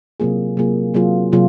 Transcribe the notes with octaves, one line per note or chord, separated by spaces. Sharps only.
C3 F#3 A#3 F4 G#4
C3 F#3 A#3 F4 G#4
C3 F#3 A#3 F4 G#4
C3 F#3 A#3 F4 G#4